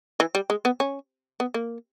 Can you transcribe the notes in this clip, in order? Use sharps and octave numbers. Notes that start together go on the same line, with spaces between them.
E3
G3
G#3
B3
C#4
B3
A#3